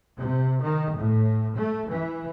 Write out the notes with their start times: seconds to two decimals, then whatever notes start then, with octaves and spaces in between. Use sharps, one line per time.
0.17 C3
0.62 D#3
0.96 A2
1.57 A3
1.89 E3